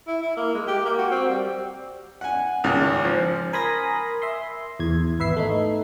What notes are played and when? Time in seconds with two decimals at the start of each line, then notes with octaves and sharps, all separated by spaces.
0.07 E4
0.23 E4
0.37 A#3
0.55 G#3
0.68 G4
0.85 A#3
0.98 F#4
1.11 C4
1.30 G3
2.21 F#5 G#5
2.64 G#1 C#2
3.05 F3
3.53 A#4 G#5 B5 C6 D#6 A#6
4.22 E5 C6
4.79 E2 G#6
5.19 G#1 B4 E5 C7
5.37 A3 D#4